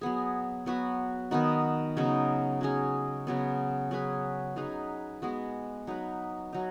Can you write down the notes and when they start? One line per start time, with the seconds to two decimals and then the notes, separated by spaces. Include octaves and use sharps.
0.01 F#3 B3 G#4
0.66 F#3 B3 F#4 B4
1.31 D#3 B3 D#4 F#4
1.97 C#3 F#3 B3 D#4
2.61 F#3 C#4 G#4
3.27 C#3 F#3 B3
3.91 F#3 C#4 G#4 B4
4.56 F#3 D#4 G#4 B4
5.22 G#3 B3 F#4
5.87 F#3 D#4 B4
6.53 F#3 D#4